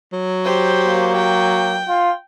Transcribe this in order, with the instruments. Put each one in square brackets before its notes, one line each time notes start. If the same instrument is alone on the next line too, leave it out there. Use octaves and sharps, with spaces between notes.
[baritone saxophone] F#3
[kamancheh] G4 C5
[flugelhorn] A#3
[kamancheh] G5
[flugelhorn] F4